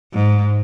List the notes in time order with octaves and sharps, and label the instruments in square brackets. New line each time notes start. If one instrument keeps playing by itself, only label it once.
[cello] G#2